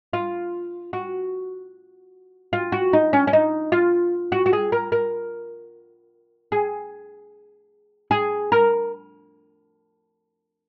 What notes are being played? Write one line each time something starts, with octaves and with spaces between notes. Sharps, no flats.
F4
F#4
F4
F#4
D#4
C#4
C#4
D#4
F4
F#4
F#4
G#4
A#4
A#4
G#4
G#4
A#4